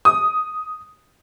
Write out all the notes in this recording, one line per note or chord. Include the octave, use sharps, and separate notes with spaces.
D#6